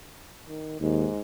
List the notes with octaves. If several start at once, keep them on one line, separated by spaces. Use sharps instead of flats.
D#3
D#2 G#2